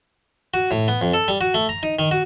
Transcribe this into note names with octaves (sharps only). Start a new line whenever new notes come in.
F#4
A2
B3
F2
A4
G3
F#4
A3
A#5
D#4
D#3
F#4